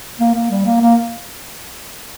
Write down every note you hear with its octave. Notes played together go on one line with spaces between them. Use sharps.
A#3
A#3
G3
A#3
A#3